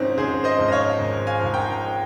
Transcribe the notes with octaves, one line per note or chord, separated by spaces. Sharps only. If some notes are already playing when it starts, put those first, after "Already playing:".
Already playing: G#1 G#2 F3 C4 C#4 D#4
G#1 G#4 C5
C5 D#5
G#2 F3
D#5
C#5 F5
G#1
F5 G#5
G#2 F3
G5 A#5